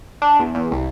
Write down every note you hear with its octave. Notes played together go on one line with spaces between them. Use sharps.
D4
E2
E2
C2